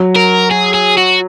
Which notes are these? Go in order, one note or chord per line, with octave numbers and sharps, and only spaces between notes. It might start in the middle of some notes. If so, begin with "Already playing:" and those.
Already playing: F#3
A#4
G#4
G#4
F#4